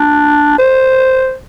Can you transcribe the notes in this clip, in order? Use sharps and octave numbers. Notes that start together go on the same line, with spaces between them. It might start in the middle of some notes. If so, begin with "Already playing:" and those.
Already playing: D4
C5